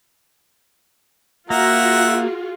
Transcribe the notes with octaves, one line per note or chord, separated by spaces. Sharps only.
A#3 F4 F#4 G#4 E5 F#5 A#5